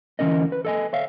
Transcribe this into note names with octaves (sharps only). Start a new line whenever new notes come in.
D2 E3 A#3 C#4 A#4 D#5
B4
A4 D#5 G#5
C#5 E5 F5